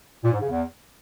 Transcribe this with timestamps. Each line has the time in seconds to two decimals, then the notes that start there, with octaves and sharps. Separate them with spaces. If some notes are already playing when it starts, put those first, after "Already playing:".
0.24 A#2
0.33 G#2
0.41 C#3
0.50 E2